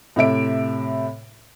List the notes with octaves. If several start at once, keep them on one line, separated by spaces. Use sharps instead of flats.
A2 C3 E5 D7